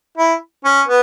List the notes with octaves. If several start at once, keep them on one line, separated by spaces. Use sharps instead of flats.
E4
C#4
B3